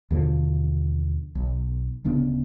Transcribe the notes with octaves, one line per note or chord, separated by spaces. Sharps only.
D#2 B2 D3 F3
B1
D1 C#3 B3 D4